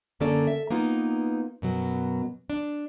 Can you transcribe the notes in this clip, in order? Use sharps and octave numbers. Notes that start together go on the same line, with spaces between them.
F#2 D3 A#3 C#4 A4 D5
E5
A#3 B3 D#4 F4
F#2 B2 F#3
D4